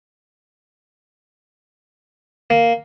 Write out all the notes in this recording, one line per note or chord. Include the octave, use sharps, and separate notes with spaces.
A#3